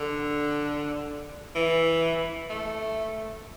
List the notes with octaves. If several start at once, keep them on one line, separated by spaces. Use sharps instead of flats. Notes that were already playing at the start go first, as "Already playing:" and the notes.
Already playing: D3
E3
A3